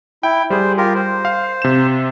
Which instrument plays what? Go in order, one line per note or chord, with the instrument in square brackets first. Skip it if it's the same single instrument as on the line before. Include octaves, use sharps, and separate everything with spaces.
[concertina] E4 [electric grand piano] G5
[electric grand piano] G3 G#4 [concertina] C5
[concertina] F4 G4 A#4
C5
[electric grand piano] F5
C3 E7